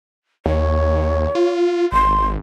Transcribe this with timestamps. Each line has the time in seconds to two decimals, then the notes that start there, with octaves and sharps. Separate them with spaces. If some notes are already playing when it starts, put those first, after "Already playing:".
0.46 D#2 C#5
1.35 F4
1.92 G#1 C6